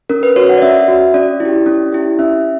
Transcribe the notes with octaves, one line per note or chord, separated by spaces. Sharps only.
C#4 A#4
B4
F#4 C#5
F#5
D5
C#4 E5
F#4
C#4 D5
E4
G4
C#4
E4 G4
C#4 E5